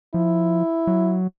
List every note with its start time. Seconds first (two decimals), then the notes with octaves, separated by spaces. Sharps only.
0.14 F3 E4
0.87 F#3